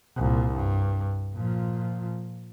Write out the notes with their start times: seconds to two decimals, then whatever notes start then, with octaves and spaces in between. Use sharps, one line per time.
0.17 C2 A#2
0.55 G2
1.34 A#2 F3